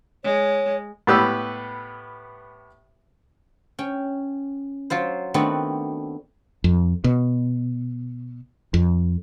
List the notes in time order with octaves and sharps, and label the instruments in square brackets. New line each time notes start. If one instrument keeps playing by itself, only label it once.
[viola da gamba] G#3 [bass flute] C#5
[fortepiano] A2 B3 G4 B4 E6
[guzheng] C#4 G5
F#3 F4 C5
D#3 A3 B3 C4 D4 F#4
[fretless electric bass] F2
B2
F2